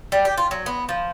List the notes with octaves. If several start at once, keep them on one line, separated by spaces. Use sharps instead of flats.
G3
G4
F4
F#3
B3
F3